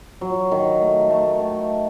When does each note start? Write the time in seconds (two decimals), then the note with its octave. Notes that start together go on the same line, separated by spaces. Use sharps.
0.21 F#3
0.51 D#3
0.81 A3
1.10 A3
1.40 D#3